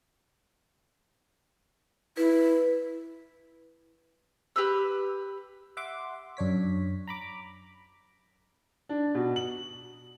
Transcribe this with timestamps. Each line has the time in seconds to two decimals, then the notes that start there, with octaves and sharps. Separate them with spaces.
2.17 E4 B4
4.56 G4 B4 E6
5.77 E5 F#5 C6 D6
6.37 F#2 D4 C#5 B6
7.07 A#5 B5 D6
8.89 D4
9.15 B2
9.36 F#7